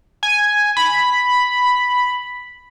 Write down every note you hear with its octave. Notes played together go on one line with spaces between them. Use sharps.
G#5
B5